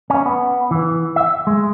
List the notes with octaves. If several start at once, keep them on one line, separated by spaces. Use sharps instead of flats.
C#4
B3
E3
E5
G#3